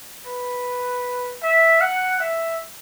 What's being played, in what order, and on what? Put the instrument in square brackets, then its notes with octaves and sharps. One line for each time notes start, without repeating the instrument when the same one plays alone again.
[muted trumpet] B4
E5
F#5
E5